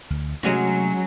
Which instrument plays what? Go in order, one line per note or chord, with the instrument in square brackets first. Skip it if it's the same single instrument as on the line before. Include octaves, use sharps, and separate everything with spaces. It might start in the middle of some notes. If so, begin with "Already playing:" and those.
[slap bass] D2
[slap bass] C3 A3 [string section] F#3 [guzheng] G#3 C#4 F#4